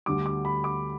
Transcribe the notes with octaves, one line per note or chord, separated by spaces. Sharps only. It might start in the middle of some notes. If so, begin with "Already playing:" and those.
D2 D3 G3 D6
D6
B5
D6